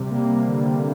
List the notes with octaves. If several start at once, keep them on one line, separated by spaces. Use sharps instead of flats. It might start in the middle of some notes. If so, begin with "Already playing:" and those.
Already playing: C3 G3
A#3
D3